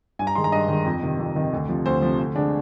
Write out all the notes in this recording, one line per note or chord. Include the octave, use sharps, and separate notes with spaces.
G2 G#5
A#5
D#3 G#3 D#4 C6
A#5
G2 D#5
D#3 G#3 D#4
F2
C3 D#3
F2
C3 D#3
D2
C3 F3
D2 C5
C3 F3
D2
D3 G#3 D4